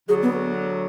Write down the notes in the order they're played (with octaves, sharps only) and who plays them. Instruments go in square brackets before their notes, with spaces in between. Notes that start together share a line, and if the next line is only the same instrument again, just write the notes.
[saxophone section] D2 D3 F#3 [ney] G#4
[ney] B3